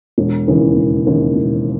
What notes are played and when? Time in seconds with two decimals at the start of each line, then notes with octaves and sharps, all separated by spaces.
0.18 E1
0.48 D#2 C#3 E3
0.76 E1
1.06 D#2 C#3 E3
1.35 E1